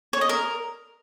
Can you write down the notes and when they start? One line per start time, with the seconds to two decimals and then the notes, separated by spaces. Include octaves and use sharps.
0.13 C#5
0.21 D#5
0.29 A#4